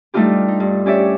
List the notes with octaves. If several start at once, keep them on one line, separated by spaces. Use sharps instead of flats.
G3 A3 D4 D#4 F4 G4
D#4
G2
C#4 D4 G4 C#5 D5 E5